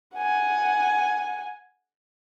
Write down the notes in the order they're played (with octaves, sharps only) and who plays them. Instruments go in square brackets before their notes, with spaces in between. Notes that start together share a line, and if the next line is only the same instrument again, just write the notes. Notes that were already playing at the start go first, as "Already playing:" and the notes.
[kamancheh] F#5 G#5